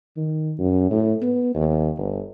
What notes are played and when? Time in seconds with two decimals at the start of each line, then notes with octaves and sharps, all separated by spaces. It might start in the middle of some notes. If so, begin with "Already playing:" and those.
0.17 D#3
0.59 F#2
0.91 A2
1.22 B3
1.54 D#2
1.98 G1